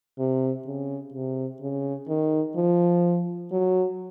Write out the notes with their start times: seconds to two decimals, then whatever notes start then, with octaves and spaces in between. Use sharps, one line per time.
0.19 C3
0.67 C#3
1.14 C3
1.62 C#3
2.09 D#3
2.56 F3
3.52 F#3